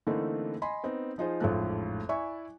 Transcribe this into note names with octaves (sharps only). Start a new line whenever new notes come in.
D3 E3 A3 A#3 C4 D#4
D#5 G#5 B5 C6
B3 C4 D#4
F3 D#4 F4 G#4 C5
A1 F2 G#2 F3 A3 F#6
E4 D5 E5 G#5 C#6